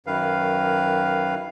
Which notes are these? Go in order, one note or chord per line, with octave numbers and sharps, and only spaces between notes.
F#2 D#3 B4 F5